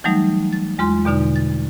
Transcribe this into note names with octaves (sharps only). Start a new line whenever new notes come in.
E3 F#3 G3 A3 D#4
A6
E2 G#3 F4 C6
E2 B2 D3 D#4
A6